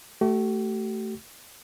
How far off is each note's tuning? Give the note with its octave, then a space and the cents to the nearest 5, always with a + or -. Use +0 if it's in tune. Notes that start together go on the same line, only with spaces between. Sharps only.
A3 +0 G4 -45